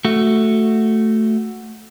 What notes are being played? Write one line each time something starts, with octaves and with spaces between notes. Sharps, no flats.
A3 F#4